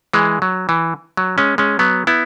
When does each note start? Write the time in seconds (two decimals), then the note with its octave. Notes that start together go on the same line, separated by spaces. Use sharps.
0.13 E3 G#3
0.42 F#3
0.69 E3
1.17 F#3
1.38 G#3 C#4
1.58 G#3 C#4
1.79 F#3 B3
2.07 B3 E4